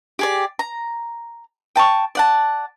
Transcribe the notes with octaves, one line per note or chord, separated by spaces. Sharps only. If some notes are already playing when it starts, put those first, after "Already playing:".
G4 G#4 D5
A#5
G5 A5 B5 C#6
D5 F#5 A5